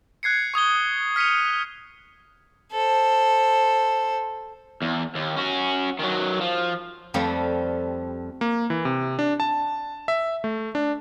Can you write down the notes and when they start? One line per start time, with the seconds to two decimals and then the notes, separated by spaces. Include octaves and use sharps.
0.23 F#6 G#6 C7 C#7
0.54 C#6 D#6 G#6 G7
1.16 F6 B6 C#7 D#7 F7
2.72 A4 C5
4.82 E2
5.15 D#2
5.36 C#4 F#4
5.99 D#3 F#3
6.41 F3
7.14 F2 F3 G3 A3 F5
8.41 A#3
8.70 E3
8.85 C3
9.19 D4
9.40 A5
10.08 E5
10.44 A3
10.75 D4